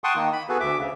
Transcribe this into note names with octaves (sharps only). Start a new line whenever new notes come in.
F#5 G5 A5 C6 C#6 D#6
D#3 A#3
B5
B3 F#4 G#4 A4 B4
D2 E5 D6
C#3